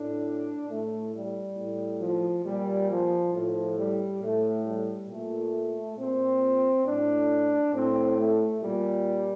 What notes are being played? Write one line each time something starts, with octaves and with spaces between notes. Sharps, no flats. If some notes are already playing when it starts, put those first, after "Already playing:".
Already playing: A2 D4
A2 A3
G3
A2
F3
A#2 G3
F3
A2 F3
G3
A2 A3
G3
A#2 A3
A#2 C4
A2 D4
A2 C4
A3
A#2 G3